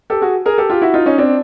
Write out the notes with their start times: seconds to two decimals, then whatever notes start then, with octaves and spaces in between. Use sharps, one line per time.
0.10 G4 A4
0.21 F#4 G#4
0.46 G#4 A#4
0.58 G4 A4
0.70 F4 G4
0.82 E4 F#4
0.94 D#4 F4
1.06 C#4 D#4
1.18 C4 D4